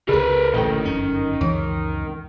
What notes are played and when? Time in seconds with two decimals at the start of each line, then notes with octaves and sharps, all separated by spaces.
0.09 C#2 C#3 G#4 A#4 B4
0.54 A1 D2 A#2 D#3 A4 G5
0.85 G1 F#2 C#4
1.41 C#2 F#2 E3 C4